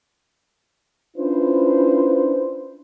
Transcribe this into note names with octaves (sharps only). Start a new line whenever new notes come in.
C#4 D4 E4 F4 B4 C5